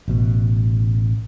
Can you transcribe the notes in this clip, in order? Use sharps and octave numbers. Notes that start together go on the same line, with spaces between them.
A1 B2